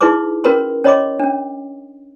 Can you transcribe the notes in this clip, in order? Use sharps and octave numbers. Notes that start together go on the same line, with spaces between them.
D#4 E4 G#4 B4 C6 D6
C#4 F#4 A#4 B4 B5 C6
C#4 C#5 D#5 B5 C6 D6
C#4 D4